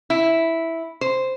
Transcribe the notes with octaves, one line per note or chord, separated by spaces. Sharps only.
E4
C5